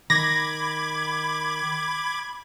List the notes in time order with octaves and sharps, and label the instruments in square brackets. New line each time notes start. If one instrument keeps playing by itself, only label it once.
[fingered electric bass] D#3 [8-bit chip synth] B5 D6 G#6 [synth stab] A#6